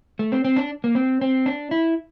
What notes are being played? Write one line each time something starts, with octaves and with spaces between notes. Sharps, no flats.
A3
C4
C4
D4
A#3
C4
C4
D4
E4